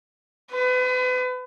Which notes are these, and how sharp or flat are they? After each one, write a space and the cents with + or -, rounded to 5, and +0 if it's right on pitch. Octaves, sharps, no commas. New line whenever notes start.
B4 +35